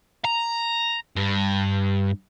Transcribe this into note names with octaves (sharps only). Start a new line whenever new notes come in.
A#5
G2